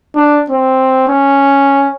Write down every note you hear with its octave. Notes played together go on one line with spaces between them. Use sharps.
D4
C4
C#4